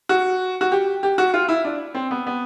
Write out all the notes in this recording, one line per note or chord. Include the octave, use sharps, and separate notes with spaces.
F#4
F#4
G4
G4
F#4
F4
E4
D4
C4
B3
B3